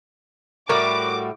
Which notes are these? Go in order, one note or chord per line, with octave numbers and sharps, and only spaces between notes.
A2 G3 F#4 A#4 D6